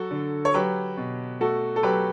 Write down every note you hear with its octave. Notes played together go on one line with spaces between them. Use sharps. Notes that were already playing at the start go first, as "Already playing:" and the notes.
Already playing: F#3 F#4 A4
D3
C#5
F#3 G4 B4
B2
A3 F#4 A4
A4
F#3 G4 B4